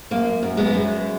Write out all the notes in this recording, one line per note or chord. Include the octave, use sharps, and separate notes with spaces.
F#2 A#3
F#2
G#3 B3
F#2